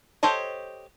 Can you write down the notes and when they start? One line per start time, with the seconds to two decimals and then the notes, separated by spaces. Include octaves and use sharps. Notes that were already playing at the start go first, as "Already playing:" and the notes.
0.23 G4 A4 C5 C#5 D#5